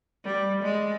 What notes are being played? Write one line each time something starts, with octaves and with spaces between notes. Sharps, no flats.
G3
G#3